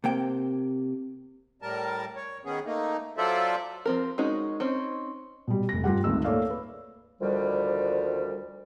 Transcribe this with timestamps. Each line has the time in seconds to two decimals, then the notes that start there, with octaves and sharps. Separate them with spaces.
0.04 C3 A#3 G5
1.62 A2 G3 A#4 A5
2.16 C#5
2.45 D#3 B3 C#4 G#4
2.65 A3 A#3 D#4
3.18 F#3 F4 A4 C5 D5 E5
3.85 F3 C4 A#4
4.18 G#3 C#4 D#4 F#4 A#4
4.60 C4 C#4 D#4
5.48 B2 G3
5.69 F1 A#6
5.84 G2 F4 G4 F#5
6.04 G#1 D2 A3 D#4 E6
6.24 A3 A#3 A4 C#5 D5 F5
6.50 B4
7.21 D2 D#3 F3 G3